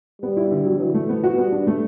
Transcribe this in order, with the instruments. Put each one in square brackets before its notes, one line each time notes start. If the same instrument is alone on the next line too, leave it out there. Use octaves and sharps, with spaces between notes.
[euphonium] G3 [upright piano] B3
[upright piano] E4
D3
F#3
[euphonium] E3 [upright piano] F#3
[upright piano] A3
B3
F#4
[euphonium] G3 [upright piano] B3
[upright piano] D4
A3